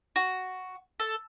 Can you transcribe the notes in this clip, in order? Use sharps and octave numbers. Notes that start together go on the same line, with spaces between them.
F#4
A4